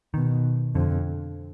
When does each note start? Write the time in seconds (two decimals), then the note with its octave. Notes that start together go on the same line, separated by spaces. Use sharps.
0.14 B2 D#3
0.75 F2 D3